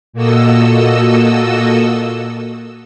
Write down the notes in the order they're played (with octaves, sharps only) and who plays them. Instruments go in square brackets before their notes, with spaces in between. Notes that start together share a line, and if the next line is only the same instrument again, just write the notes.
[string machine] A#2 A#3 F#4 A4 D#5 E6